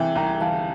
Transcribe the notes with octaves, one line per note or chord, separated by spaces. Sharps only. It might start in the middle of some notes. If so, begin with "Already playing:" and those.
Already playing: C3 E3 E5 G5
C2 G5 A#5
E3 F5 A5